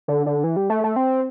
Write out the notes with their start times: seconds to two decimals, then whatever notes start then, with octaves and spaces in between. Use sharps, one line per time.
0.08 D3
0.26 D3
0.44 E3
0.56 G3
0.70 A3
0.84 A3
0.96 C4